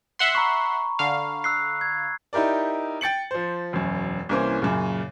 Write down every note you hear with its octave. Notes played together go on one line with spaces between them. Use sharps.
E5 F#5 C6
A#5 B5 C#6
D3 F5
E6 F#6 C7
G#6
D#4 E4 G4 A#4 D5
G5 A6 C#7 F#7
F3 C5
E1 F#2
C2 E3 A#3 C#4 C5
F#2 A#2 C#3